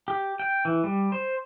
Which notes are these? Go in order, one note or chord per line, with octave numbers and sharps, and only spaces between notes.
G4
G5
E3
G3
C5